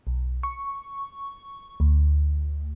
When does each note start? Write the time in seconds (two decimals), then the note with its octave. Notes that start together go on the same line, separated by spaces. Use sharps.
0.07 B1
0.43 C#6
1.80 D2